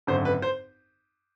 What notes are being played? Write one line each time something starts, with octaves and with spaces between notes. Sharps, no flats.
G#1 F#2 D3 C5
B4
C5